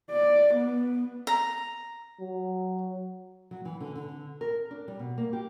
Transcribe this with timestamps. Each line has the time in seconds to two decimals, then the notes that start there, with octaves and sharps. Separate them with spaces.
0.11 D5
0.54 B3
1.27 A#5
2.20 F#3
3.51 F#3
3.65 E3
3.81 D3
3.96 D3
4.41 A#4
4.71 D4
4.88 G3
4.99 B2
5.18 A#3
5.33 G4